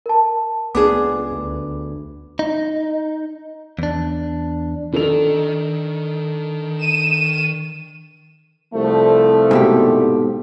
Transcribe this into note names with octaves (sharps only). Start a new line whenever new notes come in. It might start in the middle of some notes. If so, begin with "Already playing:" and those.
A#4 A5
C#2 B3 D4 G#4 D6
D2
D#4
E2 D4
D#3 D4 A4 F7
D#7 E7
C2 F3 A3
G#2 B2 G4